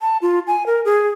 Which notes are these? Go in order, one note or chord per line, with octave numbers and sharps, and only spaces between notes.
A5
F4
G#5
A#4
G#4